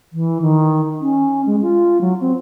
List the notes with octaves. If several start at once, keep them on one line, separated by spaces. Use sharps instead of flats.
E3
D#3
C#4
G#3
F4
F#3
C4